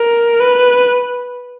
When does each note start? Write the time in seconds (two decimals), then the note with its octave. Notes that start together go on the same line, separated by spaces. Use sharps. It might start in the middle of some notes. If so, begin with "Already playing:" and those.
Already playing: A#4
0.40 B4